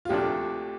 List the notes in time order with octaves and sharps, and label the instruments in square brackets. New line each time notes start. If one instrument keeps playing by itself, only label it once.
[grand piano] F4
[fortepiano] D2 C3 F3 A3 D4 [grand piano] G4